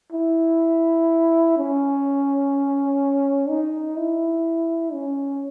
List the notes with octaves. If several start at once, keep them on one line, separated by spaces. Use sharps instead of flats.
E4
C#4
D#4
E4
C#4